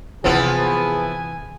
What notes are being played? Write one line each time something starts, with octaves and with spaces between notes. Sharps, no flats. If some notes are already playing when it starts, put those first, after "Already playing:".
C3 E3 F3 B3 E4 G#4 G#5